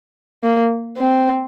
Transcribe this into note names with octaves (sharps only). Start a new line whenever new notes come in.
A#3
C4